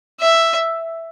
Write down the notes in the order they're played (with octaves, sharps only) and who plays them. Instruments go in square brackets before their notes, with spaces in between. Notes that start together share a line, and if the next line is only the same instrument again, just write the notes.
[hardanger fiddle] E5